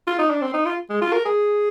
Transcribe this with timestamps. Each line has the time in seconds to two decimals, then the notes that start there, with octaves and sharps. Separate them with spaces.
0.07 F4
0.19 D#4
0.30 D4
0.42 C4
0.53 D#4
0.65 F4
0.89 G#3
1.01 F4
1.13 A#4
1.25 G#4